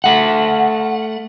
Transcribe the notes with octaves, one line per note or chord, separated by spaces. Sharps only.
A3 F#5